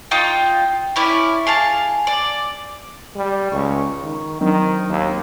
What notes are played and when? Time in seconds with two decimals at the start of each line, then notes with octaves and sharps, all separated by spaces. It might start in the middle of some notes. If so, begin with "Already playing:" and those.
0.11 D#4 F4 G5
0.96 C#4 E4 D5
1.47 G#4 F5 A5
2.07 D5
3.16 G3
3.52 C#2 C#6
4.02 D#3
4.41 D#3 F#3 C4 D4
4.90 D#2